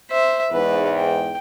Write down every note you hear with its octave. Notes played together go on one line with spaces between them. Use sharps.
C5 E5
E2 G#2 B4
G5